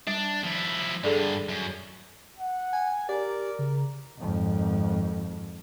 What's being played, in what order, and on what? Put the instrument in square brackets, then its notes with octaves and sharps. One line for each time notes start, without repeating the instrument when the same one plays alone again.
[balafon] G3 [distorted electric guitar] D4
[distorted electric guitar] F3 E4
[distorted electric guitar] G2 D3 [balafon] G#4 A4 D5
[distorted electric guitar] F#2
[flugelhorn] F#5
[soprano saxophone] G#5
[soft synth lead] G4 [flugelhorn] A#4 [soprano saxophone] D5
[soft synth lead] C#3
[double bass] G#1 F2